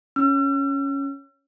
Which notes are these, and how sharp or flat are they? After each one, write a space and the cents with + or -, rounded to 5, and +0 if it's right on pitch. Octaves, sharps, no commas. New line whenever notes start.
C#4 +0 E6 +45